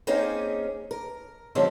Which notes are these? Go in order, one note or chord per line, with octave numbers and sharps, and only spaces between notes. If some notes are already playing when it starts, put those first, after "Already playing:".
A#3 C4 C#4 D#4 G#4
A#4
D3 F3 F#3 G#3 C4 C#4